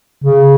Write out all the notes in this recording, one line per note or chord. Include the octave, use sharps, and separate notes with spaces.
C#3